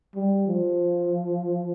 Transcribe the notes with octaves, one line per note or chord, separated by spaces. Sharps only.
G3
F3